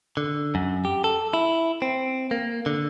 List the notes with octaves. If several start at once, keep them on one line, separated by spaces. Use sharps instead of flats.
D3
F#2
G4
A4
E4
C4
A#3
D3